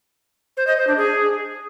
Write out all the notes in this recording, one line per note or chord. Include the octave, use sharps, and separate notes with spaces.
C5
D#5
C5
D4
G#4